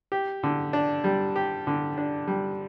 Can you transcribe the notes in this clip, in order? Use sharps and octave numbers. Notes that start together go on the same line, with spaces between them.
G4
D3
D4
G3
G4
D3
D4
G3